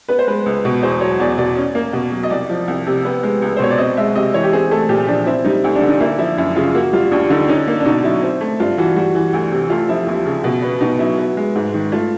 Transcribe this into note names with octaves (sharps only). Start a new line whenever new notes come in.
B3 B4
C5
G#3 B4
C#2
B2
E2 C5
F#3 C#5
E2 D5
B2 D5
C#4
A#3
B2
F#3
D#5
C2 D5
F3
C2
C3
B3
G#3
C#2
C5
B2 C#5
D5
C4 D#5
G#3 E5
C3 D#5
E3 C#5
G4
C4 G#4
A3 A4
A#2 G4
F3 D4
C4 E4
G3 D#4
D2
D4
D3
D#4
A#3 E4
F3 E4
F#2 E4
C#3 F4
A#3 F#4
G3 F4
D#2 D4
D3 D#4
C#4 D#4
A#3
D4
B2 D#4
F#3 E4
C4
A3
G2 F4
E3 F#4
G3 F#4
E3
D2
C3
A3 F4
F3 E4
D#2
C#3
B2
B3
B2 D#4
F#3 E4
B3
G#3
G#2
D#3
A3 F4